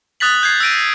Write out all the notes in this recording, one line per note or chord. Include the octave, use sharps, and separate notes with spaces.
D#6 F#6 A6 B6 F#7
G6 G#6 C7
E6 A#6 D7 D#7